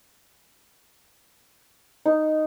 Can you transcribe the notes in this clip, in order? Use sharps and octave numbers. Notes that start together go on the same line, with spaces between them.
D#4